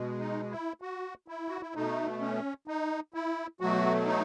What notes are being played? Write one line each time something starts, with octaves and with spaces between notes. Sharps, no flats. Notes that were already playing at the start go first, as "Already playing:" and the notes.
Already playing: B2 G#3
D#4
E4
F#4
E4
F#4
E4
B2 A3 D#4
C#4
D#4
E4
B2 F#3 A3 F#4
D#4